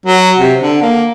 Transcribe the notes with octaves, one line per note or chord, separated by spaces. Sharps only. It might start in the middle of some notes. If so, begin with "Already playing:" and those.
F#3
C3
D3
A#3